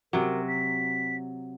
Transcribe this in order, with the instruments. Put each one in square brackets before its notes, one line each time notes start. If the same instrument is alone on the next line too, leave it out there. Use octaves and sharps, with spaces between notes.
[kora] C3 F#3 [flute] A#4
[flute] B6